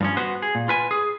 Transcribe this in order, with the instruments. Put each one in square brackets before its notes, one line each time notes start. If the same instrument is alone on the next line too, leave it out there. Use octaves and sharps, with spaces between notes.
[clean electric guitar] G2 F3 C#4
B3 F#4 B4 C5
G#4
A#2
F4 B4 G#5
G#4